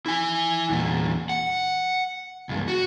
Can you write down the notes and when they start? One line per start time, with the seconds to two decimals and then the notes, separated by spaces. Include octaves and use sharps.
0.06 E4 G#5
0.70 E2 A#2
1.29 F#5
2.49 C#2 G2
2.68 F#4